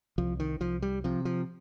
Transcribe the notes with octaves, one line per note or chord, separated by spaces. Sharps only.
C2 F3
D#3
C2 F3
G3
C3 F3
F3